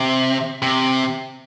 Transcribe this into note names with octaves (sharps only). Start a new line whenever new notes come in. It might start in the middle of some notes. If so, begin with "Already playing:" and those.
Already playing: C3
C3